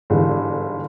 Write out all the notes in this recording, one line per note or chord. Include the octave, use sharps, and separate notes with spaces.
G1 G#2 D3 E3 G3